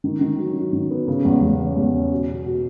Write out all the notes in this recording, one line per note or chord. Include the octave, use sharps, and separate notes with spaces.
D#3
D#3
F#3
F#3
D#3
B3
C#3
E2
E2
C#4
E2
C#4
B2
B2
B2